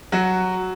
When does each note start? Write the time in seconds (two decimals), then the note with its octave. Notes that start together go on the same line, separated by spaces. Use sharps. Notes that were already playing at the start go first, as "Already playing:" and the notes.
0.12 F#3 F#4